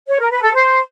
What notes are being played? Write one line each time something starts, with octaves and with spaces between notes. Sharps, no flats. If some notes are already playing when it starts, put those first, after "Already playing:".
C#5
A#4
B4
A4
C5